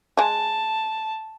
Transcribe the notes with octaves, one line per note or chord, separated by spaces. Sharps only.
G#3 G#4 A5